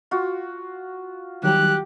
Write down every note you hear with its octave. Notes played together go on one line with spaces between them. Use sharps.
F4 F#4
D#3 F#3 G3 G4 F#6